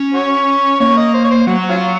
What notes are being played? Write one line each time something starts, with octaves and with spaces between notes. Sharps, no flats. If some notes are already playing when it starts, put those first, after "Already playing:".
Already playing: C#4
F#4 C#5
A#3 C#5
D#5
C5
C#5
C5
F#3 F#4
C#4 F4